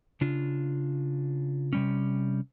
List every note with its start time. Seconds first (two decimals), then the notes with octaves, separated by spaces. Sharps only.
0.21 C#3 D4 F4
1.73 C3 G3 C#4